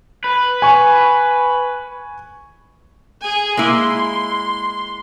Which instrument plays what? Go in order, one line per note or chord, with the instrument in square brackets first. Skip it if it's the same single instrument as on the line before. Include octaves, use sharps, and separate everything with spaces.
[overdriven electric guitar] B4
[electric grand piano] G#5 C#6
[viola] G#4 G#5
[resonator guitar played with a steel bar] G#3 A#3 E4 [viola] C6